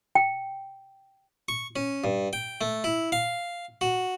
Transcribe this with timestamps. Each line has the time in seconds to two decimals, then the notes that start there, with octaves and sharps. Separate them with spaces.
0.15 G5
1.48 C#6
1.76 C#4
2.04 G2
2.33 G5
2.61 A3
2.84 E4
3.12 F5
3.81 F#4